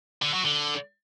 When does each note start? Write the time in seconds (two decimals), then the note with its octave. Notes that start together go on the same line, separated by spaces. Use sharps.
0.22 D3
0.34 F#3
0.45 D3